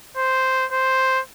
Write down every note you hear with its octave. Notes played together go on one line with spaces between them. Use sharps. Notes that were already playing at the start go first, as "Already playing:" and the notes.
C5
C5